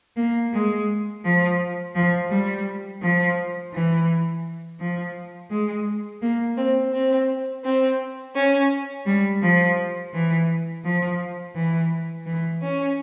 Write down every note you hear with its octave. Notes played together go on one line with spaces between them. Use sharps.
A#3
G#3
F3
F3
G3
F3
E3
F3
G#3
A#3
C4
C4
C4
C#4
G3
F3
E3
F3
E3
E3
C#4